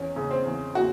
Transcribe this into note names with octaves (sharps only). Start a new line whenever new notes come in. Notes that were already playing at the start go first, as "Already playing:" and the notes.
Already playing: E2 C#4
C#3
C4
E2
C#3 F#4